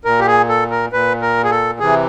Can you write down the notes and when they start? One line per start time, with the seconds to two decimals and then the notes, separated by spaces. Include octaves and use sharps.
0.05 A#2 A#4
0.19 G4
0.27 G#4
0.49 A4
0.70 A#4
0.92 A#2 B4
1.22 A#4
1.44 G#4
1.51 A4
1.80 C3 E3 G#4